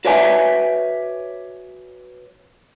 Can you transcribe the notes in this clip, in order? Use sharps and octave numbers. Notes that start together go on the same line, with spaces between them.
F#4 B4 C#5 D5 E5 G#5